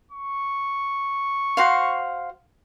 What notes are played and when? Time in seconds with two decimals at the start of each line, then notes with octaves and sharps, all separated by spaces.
0.11 C#6
1.57 F#4 C5 F5